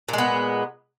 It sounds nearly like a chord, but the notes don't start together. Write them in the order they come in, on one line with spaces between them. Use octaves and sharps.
A#2 G#3 B3